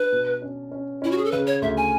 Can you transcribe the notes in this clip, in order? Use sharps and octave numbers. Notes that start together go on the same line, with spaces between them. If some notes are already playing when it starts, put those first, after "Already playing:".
Already playing: D4 B4
B2
C#4
C#4
C#4 E4
F#4
G#4
A4
C#3 B4
C#5
D2 E5
G#5